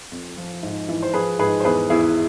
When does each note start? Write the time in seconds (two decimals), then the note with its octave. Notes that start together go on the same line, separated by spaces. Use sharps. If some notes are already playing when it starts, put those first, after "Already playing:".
0.12 F2
0.37 F3
0.63 G#2
0.89 E3
1.02 C5
1.13 F3 G#4 B4
1.39 G#2 G#4 B4
1.60 C5
1.64 E2 G#4 B4
1.90 E2 E4 G#4